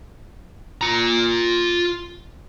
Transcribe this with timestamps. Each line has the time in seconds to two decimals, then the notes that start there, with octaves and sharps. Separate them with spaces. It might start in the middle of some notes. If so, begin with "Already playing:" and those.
0.81 F4 A#5